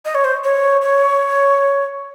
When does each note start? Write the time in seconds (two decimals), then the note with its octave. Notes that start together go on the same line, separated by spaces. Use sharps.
0.05 D#5
0.15 C#5
0.24 C5
0.44 C#5
0.81 C#5